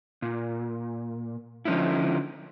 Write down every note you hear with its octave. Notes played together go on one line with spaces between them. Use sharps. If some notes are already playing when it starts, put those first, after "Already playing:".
A#2
D3 F3 B3 C#4 D#4 E4